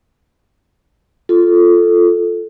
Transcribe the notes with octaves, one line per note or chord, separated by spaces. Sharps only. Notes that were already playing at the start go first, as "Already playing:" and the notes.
F4 A4